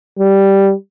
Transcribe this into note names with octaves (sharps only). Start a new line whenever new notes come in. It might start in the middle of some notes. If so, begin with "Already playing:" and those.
G3